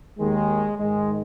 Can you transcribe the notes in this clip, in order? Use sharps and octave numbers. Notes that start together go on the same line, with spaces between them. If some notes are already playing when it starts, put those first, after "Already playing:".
D#2 D#3 G#3
G#2 D#3 G#3